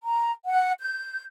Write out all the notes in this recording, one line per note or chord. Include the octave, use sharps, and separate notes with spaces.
A#5
F#5
G6